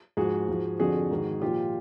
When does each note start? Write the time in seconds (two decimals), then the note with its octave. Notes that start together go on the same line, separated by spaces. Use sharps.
0.17 G#2 F3 F#4 G#4
0.49 G#2 F3
0.79 F2 D3 F3 F#4 G#4
1.11 G#2 D#3
1.42 A#2 F3 F4 G4